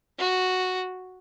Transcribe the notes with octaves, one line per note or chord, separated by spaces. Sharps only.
F#4